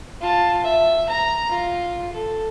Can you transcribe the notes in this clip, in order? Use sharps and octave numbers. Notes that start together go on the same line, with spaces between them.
F4 A5
E5
A#5
F4
A4